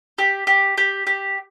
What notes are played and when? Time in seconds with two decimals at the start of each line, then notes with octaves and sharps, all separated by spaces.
0.18 G4
0.47 G4
0.78 G4
1.07 G4